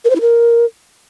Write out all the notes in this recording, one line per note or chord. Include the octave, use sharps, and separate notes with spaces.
A#4
C5
E4
A#4